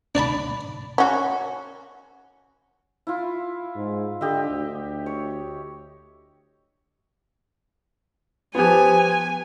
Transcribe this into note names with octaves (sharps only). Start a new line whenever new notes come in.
D4 D5 A5 B5
C#4 F#4
E4 F4
G#2
D3 G4 D#5 E5
D2
C#5
F3 B3 G4 G#5